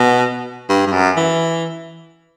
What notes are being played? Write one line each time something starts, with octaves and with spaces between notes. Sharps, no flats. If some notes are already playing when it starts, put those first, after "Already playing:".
Already playing: B2
G2
G2
F#2
E3